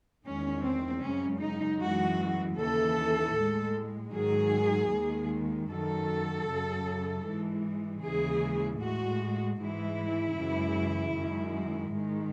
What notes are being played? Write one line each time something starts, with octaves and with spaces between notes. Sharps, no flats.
E2 D#3 G#3 C#4
C4
F#2 C#3 G#3 C#4
D#4
F#2 E3 G#3 F#4
D#2 C#3 E3 A4
A2 G#3
G#2 D#3 F#3 G#4
D#2 D#3 G#3
F#2 D#3 F#3 A4
F#2 C#3 F#3
G#2 E3 G#3
D#2 C#3 E3 G#3 G#4
A2 G#3 F#4
G#2 E3 G#3 E4
F#2 C#3 E3 G#3
F#2 D#3 G#3
G#2 D#3 G#3